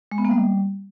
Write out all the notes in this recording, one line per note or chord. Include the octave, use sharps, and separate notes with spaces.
G#3
B3
A#3
G3